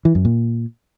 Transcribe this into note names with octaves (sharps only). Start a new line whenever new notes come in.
E3
F#2
A#2